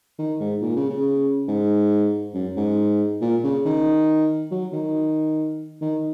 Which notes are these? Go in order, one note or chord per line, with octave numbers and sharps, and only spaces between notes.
D#3
G#2
A#2
C#3
C#3
G#2
F#2
G#2
A#2
C#3
D#3
F#3
D#3
D#3